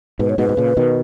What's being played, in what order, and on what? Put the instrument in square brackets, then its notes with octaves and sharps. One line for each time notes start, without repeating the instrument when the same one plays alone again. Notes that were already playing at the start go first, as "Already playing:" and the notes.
[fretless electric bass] G#2 B2 [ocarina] B4
[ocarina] C#5
[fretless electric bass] G#2 B2 [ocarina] B4
[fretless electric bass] B2
A#2 C#3
B2 D#3